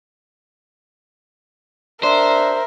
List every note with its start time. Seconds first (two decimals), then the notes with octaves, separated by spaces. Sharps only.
2.03 D4 A#4 C5 E5